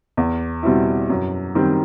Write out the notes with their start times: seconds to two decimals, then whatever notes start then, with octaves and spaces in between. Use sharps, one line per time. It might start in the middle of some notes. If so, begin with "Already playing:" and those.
0.17 E2
0.63 B2 G3 C4 E4
1.10 F#2
1.55 D#3 G3 C4